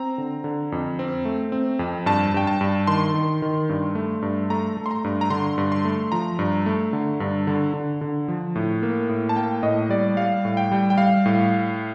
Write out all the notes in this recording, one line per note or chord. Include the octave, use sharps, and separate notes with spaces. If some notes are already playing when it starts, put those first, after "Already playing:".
Already playing: C4 A#5
D3
D3
F2
C4
A3
C4
F2
G2 A5
G2 G5
A5
G2
D#3 C6
D#3
D#3
G2
A3
G2
A3 A#5
A3
C6
A#5
G2
A#5
D3 C6
G2
C6
A3
F3 A#5
G2
A3
D3
G2
D3
D3
D3
F3
A2
A#3
A2
A5
A#3 G5
A2 D#5
G3 D5
G3 F5
A2
G5
G3
G5
G3 F5
A2